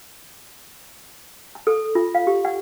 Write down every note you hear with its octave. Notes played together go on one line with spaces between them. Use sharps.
A5
A4
F4
F5
G4
F#5